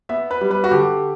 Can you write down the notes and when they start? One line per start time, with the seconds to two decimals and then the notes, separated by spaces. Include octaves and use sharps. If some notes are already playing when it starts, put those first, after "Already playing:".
0.09 B3 E5
0.31 B4
0.41 G3
0.51 B4
0.64 F#4
0.71 D3 G4